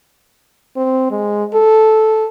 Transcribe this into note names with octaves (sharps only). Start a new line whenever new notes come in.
C4
G#3
A4